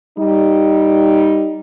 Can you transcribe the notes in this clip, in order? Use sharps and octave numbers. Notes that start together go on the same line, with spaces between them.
G3 D#4